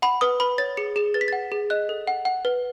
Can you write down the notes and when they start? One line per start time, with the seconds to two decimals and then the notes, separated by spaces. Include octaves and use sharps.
0.02 F#5 B5
0.21 B4 D#6
0.40 B4 B5
0.58 C#5 A6
0.77 G#4 C#7
0.96 G#4 E7
1.14 B4 A6
1.21 B6
1.28 F#5 A6
1.52 G#4
1.70 D#5 F#6
1.89 A4
2.07 F#5
2.25 F#5
2.45 B4